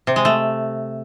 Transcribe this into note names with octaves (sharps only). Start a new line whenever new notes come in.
C3
G#3
A3